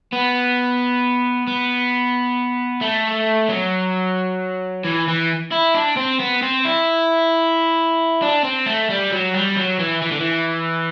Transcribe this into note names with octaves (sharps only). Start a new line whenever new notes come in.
B3
B3
A3
F#3
E3
E3
E4
D4
C4
B3
C4
E4
D4
C4
A3
G3
F#3
G3
F#3
E3
E3
D3
E3